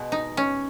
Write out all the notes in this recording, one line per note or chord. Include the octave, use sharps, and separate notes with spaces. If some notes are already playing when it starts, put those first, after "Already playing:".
Already playing: B2 G#3
D#4
C#4